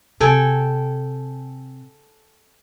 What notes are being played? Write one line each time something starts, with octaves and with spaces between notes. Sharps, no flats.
C3 A4 G5 G#5